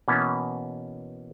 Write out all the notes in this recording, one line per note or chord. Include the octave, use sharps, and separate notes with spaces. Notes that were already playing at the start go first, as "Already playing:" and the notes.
B2 E3 A#3 B3 C#4